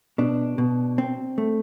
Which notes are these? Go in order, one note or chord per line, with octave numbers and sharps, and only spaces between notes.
B2 D4
B2
C4
A3